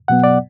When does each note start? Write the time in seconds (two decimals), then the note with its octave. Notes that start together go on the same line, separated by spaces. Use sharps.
0.08 B2 F#3 B3 F#5
0.24 D5